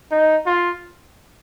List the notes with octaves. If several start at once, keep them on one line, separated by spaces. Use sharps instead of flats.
D#4
F4